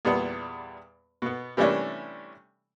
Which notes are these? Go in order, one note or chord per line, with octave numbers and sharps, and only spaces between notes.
E2 A#2 G3 B3
B2 B3
C3 E3 G3 A3 C#4 D4